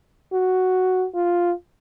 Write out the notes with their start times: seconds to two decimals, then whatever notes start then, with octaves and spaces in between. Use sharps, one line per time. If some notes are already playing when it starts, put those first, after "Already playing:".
0.33 F#4
1.15 F4